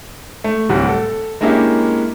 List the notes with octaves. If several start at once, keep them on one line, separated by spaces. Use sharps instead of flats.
A3
D1 A2 C3 G3 F#5
A4
G#3 A#3 C#4 D4 E4 G4